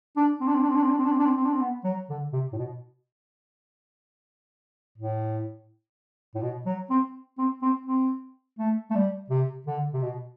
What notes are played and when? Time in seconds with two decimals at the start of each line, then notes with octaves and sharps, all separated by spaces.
0.17 D4
0.41 C4
0.48 D4
0.55 C4
0.62 D4
0.69 C4
0.77 D4
0.83 C4
0.90 D4
0.98 C4
1.05 D4
1.12 C4
1.19 D4
1.26 C4
1.37 C4
1.46 D4
1.53 C4
1.61 B3
1.84 F#3
2.10 D3
2.33 C3
2.53 A2
2.58 B2
4.98 A2
6.35 A2
6.42 B2
6.66 F#3
6.90 C4
7.38 C4
7.62 C4
7.86 C4
8.59 A3
8.91 A3
8.95 G3
9.30 C3
9.67 D3
9.94 C3
10.03 B2